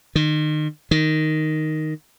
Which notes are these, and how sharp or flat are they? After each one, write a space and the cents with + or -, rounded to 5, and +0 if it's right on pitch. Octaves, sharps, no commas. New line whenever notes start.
D#3 -30
D#3 +0